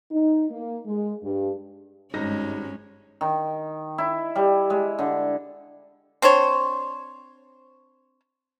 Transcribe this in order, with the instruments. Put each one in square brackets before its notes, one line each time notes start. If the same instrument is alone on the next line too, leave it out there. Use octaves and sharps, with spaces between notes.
[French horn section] D#4
A#3
G#3
G2
[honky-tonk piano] G#1 A#6 [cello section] G2 G3 G#3 [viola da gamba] C#4 [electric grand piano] D#4
[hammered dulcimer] D#3
E4
G3
G#3
D3
[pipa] C4 D4 C5 C#5